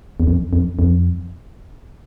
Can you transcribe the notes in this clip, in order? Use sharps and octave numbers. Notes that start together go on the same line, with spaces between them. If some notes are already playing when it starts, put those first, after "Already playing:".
E2
F2
F2
F2